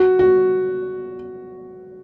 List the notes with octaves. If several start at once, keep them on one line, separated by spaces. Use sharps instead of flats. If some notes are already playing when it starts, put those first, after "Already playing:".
Already playing: F#4
F#4